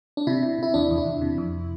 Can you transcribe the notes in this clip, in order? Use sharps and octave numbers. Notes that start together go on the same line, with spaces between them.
D4
C3 E4
C3
C3 E4
E2 D4
E2
E4
E2
C3
F2